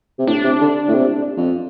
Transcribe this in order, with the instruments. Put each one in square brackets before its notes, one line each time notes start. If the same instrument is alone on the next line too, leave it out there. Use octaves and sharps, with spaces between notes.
[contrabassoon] C3
[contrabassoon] A2 [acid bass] D4
[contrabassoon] C3
D3
A2
C3
F2